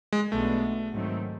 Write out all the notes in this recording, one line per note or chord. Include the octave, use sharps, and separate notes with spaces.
G#3
B1 B2 G#3 A3 B3 D4
G#2 D#3 F#3 A3 C4